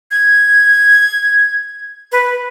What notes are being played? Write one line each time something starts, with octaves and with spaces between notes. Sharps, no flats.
G#6
B4